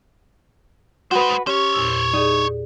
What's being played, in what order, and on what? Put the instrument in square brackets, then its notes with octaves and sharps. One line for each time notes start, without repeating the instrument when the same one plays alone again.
[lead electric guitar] G#3 C5 [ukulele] F#4 B4
[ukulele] C#4 [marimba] G4 [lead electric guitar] C5 C#5
[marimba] E2 A#2 E6
[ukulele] D#4 [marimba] G#4 D5